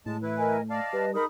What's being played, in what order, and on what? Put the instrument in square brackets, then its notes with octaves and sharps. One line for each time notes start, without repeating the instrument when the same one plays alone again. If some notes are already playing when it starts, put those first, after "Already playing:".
[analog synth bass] A2 [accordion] G#3 A5
[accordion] E3 E4 B4
[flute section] A#4 D#5 G#5
[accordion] D5 F5 [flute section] D#5 A5
[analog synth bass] G3 [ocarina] B4
[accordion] G#3 D#4 [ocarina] A#4 [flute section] B5 D#6